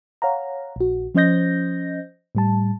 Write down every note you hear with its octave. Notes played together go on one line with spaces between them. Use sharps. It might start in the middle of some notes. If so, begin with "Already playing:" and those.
C#5 F5 F#5 A#5
A#1 F#4
F3 C#4 C5 D#5 G6 A#6
A2 G3 A5